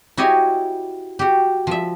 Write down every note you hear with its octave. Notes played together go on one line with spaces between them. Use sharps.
E4 F#4 G4 C#5 D#5 G#5
F#4 G4
F3 E5